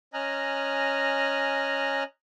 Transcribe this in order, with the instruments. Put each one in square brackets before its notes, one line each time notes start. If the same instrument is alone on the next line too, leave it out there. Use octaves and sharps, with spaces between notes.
[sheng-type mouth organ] C#4 D#5 G#5 A#5 F6 F#6